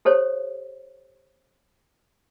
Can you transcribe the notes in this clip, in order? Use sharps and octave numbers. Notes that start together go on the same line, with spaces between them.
G4 A4 C5 C#5